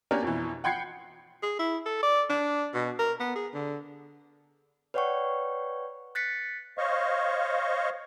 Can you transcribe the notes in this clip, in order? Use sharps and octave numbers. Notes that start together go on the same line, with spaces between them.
A#3 C#4 D4 G4 A#4
F2 B2 E3
F#5 G5 B5 G#6 C7 C#7
G#4
E4
A4
D5
D4
B2
A#4
B3
G#4
D3
B4 C#5 D5 F#5 G5 C#6
F#6 A6 B6 C#7
C5 C#5 D#5 F5 C#6